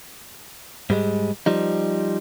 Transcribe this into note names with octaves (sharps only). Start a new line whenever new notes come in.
G#2 G3 G#3
F3 G3 D#4